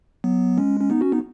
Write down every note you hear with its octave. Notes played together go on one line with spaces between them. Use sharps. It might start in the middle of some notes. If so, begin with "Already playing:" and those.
F#3 B3
G#3 C#4
C#4
B3 D#4
C#4 F#4
B3 D#4